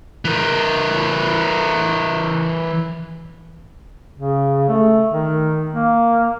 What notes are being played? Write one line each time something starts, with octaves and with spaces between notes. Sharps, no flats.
E3 A#4
C#3
A3
D#3
A#3